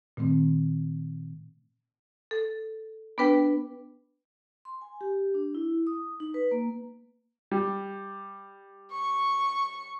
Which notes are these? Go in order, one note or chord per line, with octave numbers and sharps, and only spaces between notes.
A#2 D#3 A3 C4
A4
B3 D4 B4 G5
C6
G#5
G4
D4
E4
D#6
D#4
B4
A#3
G3
C#6